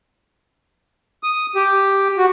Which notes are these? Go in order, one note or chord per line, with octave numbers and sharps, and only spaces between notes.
D#6
G4
F#4